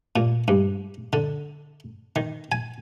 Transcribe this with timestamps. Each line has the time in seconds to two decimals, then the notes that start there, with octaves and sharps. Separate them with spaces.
0.16 A#2
0.48 G2
1.13 D3
2.16 D#3
2.52 G#5